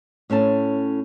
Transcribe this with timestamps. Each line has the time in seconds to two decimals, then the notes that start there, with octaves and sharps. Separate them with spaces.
0.30 A2 C#4 A4 A5